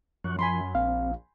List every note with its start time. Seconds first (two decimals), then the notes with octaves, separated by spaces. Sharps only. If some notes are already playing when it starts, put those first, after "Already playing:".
0.24 F#2 F3 C#6 F#6
0.39 F3 G#5 B5 C6
0.75 A#1 C4 F5